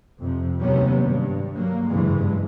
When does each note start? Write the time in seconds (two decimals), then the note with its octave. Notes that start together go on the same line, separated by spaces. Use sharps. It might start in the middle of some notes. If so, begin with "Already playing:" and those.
0.21 F2 C3
0.61 D#2 C3 F#3 G3 B3 C#4
1.02 G2
1.55 F#3 A#3
1.88 F#1 G2 E3 G#3